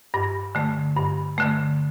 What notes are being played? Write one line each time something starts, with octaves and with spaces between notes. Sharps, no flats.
G2
D3 A3
G2
D3 A3